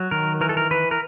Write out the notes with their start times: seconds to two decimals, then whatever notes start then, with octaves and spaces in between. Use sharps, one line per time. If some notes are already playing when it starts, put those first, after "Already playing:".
Already playing: F#3
0.11 D#3 A#4
0.41 E3 A#4
0.49 A4
0.57 A#4
0.71 E3 B4
0.91 A#4